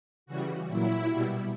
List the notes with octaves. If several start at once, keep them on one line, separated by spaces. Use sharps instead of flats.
C#3 E3 G3 F#4
A#2 F#3 E4
B2 G3